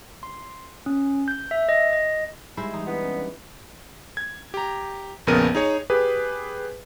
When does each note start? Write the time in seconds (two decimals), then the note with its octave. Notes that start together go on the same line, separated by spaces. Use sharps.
0.23 C6
0.86 C#4
1.28 G6
1.51 E5
1.69 D#5
1.93 D#5
2.57 G3 G#3 D#4 E4 C5
2.74 E3 G3 D#4
2.87 B3 C4 D4 E4
3.03 C#4
3.18 D4 B4 D5
4.17 G#6
4.54 G4 A#5
5.27 A#1 F2 C#3 B3 A#4 D#7
5.55 D#4 G#4 C#5
5.90 G4 G#4 B4